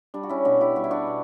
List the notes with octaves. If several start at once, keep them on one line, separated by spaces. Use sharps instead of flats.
G3 D4
F#4
C#4 E4
B2 D4 F#4
E4 G4
G3 F#4
E4
D4 F#4
B2